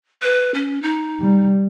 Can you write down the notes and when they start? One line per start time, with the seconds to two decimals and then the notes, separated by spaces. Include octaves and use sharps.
0.23 B4
0.54 C#4
0.83 D#4
1.21 G3